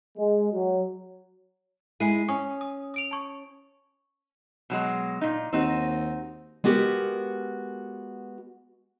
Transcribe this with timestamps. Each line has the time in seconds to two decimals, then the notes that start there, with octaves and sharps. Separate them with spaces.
0.18 G#3
0.53 F#3
2.00 G#3 E4 G#5 C7 D#7
2.28 C#4 G#5 C#6 D#6
2.61 D#6
2.94 D#6 D7 F7
3.11 A5 C#6
4.70 B2 F#3 G#3
5.21 A#2 D#4
5.53 D#2 C4 D#4 F#4
6.64 G#3 B3 F#4 G4 A#4